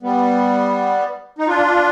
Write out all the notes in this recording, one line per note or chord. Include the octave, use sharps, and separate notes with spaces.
G3 B3
D#4
D4 F4